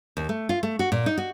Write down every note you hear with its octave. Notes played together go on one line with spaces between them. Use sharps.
D#2
A3
F4
A3
F#4
A#2
D#4
F#4